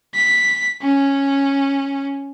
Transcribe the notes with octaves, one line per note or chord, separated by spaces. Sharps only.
B6
C#4